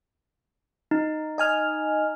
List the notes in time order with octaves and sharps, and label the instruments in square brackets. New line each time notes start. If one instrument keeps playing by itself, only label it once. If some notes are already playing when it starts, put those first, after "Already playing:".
[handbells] D#4
[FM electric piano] D#5 G#5 F6